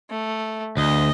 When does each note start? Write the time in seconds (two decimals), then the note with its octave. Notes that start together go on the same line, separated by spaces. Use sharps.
0.10 A3
0.77 D2 D#5